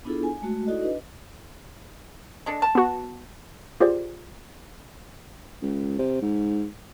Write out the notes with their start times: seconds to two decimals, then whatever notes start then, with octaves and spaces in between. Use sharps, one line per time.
0.05 B3 D4 E4 F4 G#4 A4
0.23 G#5
0.42 G#3 A3 F#4
0.66 D#4 E4 F#4 A4 D5 D#5
0.81 D4 B4 D#5
2.46 G#3 D4 A4
2.62 A5
2.75 B3 F#4
3.80 F4 G4 G#4 C5 D5
5.62 C#2
5.99 C3
6.22 G#2